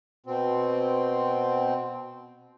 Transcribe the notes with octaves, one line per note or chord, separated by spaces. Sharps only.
B2 C4